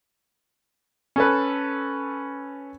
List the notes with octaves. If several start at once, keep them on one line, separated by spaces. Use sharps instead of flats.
C#4 A4 B4